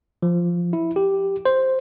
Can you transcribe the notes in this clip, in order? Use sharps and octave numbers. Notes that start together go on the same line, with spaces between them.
F3
E4
G4
C5